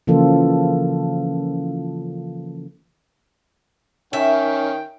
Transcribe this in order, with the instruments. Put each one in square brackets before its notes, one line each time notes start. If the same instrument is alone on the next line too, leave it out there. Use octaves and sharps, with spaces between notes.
[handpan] C#3 E3 F3 A#3 F4 A4
[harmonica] D#3 G5 [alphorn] C#4 [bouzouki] E5